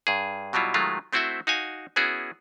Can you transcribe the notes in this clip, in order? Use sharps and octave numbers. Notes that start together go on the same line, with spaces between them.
G2 G#4
B2 F#3 G3 E4 F4
D#3 F#3 G#3 A3 F4
A3 C4 E4 F#4 C5 E5
D#4 F#4 F5 G#5
B3 C#4 E4 F#4 G#4